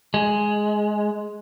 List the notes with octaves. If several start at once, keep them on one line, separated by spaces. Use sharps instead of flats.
G#3